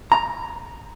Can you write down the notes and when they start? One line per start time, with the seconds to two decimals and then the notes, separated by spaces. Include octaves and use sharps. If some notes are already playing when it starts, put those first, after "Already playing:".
0.12 A#5